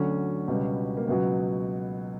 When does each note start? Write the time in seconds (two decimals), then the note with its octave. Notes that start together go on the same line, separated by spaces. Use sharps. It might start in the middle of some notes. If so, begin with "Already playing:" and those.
Already playing: D2 D3 F#3 C#4
0.48 C#2 B2 G3
0.97 A#3
1.08 C#2 B2 F#3 B3